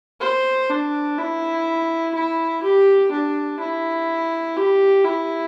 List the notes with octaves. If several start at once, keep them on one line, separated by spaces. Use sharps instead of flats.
C5
D4
E4
E4
G4
D4
E4
G4
E4